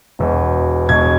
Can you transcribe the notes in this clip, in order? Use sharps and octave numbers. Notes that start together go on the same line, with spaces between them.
E1 E2 B2
E1 E2 B2 G#6